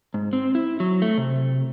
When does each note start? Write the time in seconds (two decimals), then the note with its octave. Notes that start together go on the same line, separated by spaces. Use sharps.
0.14 G#2
0.33 C4
0.55 E4
0.80 F#3
1.02 A3
1.18 C3